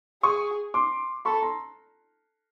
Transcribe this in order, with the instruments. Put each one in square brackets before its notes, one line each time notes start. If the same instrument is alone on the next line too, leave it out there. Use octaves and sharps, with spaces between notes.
[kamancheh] G#4 [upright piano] C#6 D#6
[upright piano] C6 D6
[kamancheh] A4 [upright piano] B5 C#6
[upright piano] A#5 C6